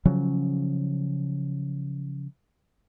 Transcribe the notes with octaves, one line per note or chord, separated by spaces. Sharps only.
C#3 F3 F#3 C#4